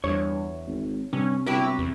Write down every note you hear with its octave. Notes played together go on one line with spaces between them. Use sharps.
E2 G2 C#5
G#1
G2 C3 C#4
G1 F#3 E4 G4 B4
E2